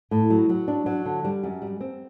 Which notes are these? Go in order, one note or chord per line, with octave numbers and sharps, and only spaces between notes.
A2
F#3
F#3
D4
F#3
D3
G3
F#2
G3
C4